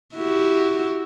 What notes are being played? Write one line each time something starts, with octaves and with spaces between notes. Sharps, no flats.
E4 F#4 G4